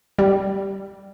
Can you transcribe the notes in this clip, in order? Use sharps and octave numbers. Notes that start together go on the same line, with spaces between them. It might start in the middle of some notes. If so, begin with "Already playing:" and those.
G3